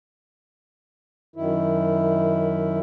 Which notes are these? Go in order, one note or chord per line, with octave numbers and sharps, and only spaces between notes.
F#2 D#3 E4